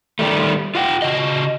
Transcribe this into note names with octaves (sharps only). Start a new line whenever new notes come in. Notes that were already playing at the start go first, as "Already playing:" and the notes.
D#3 G3 A3
F4 F#5 G5
C#3 F#4 D#5